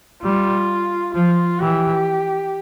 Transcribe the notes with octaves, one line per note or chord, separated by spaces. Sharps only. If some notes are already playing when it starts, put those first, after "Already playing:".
G3 F4
F3 F4
E3 G4